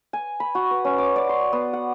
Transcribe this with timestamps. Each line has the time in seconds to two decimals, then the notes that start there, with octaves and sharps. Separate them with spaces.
0.13 G#5
0.40 B5
0.55 F#4
0.71 B4
0.85 C#4
0.98 D6
1.16 D5
1.29 C6
1.53 B3
1.73 F#5